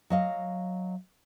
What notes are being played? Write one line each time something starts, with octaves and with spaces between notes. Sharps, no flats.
F#3 D#5 F5